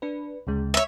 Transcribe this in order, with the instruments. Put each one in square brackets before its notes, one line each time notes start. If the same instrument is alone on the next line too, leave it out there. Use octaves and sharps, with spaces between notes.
[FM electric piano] D4 B4
D2 C#3 G#3
[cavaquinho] C#5 E5